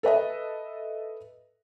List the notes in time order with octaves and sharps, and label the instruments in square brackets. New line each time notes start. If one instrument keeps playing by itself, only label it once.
[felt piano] A4 B4 D#5 E5